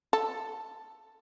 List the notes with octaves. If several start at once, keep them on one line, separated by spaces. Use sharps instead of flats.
A4